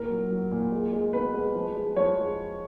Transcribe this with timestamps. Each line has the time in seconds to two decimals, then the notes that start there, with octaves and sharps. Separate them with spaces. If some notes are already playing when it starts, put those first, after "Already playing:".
Already playing: A#2 A#4
0.10 F#3
0.30 F#3
0.51 A#2
0.72 G#3
0.93 G#3
1.13 B2 B4
1.34 G#3
1.55 F3
1.76 G#3
1.96 F3 C#5
2.17 G#3